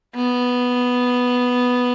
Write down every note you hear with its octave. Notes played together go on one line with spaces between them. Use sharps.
B3